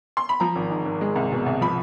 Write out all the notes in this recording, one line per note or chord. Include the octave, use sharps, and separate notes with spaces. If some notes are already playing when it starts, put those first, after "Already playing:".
C6
B5
F3 A#5
G#1
G#2
G#1
G#3
C2
B2
C2
F3 B5